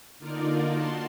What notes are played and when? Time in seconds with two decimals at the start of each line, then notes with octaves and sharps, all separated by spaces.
0.19 D3 A#3 D#4 F4 A#4 D5
0.72 F#4 A5 C6